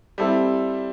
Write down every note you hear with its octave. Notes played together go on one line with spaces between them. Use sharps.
G3 C4 E4 A4